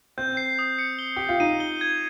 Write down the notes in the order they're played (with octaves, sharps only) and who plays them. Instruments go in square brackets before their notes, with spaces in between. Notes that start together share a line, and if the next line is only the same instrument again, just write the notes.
[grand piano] C4 [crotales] G6
[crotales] C7
D#6
C#7
G7
[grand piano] G4 [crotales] G6
[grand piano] F4
[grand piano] D#4 [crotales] D#7
[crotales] G7
G#6